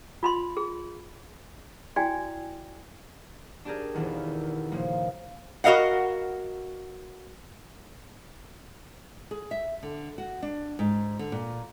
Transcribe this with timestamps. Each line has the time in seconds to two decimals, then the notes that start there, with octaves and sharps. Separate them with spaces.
0.23 F4 B5 C6
0.57 G#4
1.96 E4 F#4 D5 G5 G#5
3.65 D4 G4 G#4 A#4
3.94 E1 E2 D#3
4.72 A#2 C#3 F3 A#3
5.64 F#4 A#4 D#5 F5 F#5
9.31 G#4
9.51 E5
9.83 D3
10.18 F#4
10.42 D4
10.79 G#2
11.19 D3
11.32 A#2